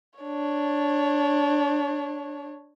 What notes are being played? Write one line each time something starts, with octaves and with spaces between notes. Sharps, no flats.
D4 C#5